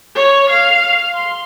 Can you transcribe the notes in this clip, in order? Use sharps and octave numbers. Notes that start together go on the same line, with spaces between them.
C#5
F5
C6